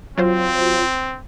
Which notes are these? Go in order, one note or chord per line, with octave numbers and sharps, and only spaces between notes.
F#3 C4 F4 C5